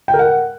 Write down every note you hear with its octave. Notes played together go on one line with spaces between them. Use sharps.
G5
A#4
F#5